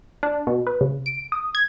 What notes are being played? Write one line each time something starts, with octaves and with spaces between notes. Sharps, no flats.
D4
B2
B4
C#3
D7
D#6
G#6